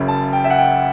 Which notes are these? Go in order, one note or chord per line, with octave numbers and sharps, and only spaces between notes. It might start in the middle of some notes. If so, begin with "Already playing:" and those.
Already playing: F#1 F#2 C#3
A5
G5
E5
F#5
G5